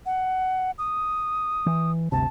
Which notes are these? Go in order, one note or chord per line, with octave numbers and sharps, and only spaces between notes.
F#5
D#6
E3
G1 D2 C3 A5